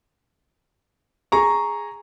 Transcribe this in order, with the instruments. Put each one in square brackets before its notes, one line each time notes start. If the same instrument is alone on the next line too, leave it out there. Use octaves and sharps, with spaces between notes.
[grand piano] G#4 A#5 C#6